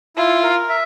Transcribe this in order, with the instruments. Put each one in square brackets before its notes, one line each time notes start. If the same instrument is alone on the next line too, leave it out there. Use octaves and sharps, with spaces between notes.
[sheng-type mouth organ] E4 [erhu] F4
[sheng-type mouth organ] A#4
E5